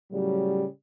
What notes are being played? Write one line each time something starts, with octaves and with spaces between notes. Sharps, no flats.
A2 C#3 F#3 G3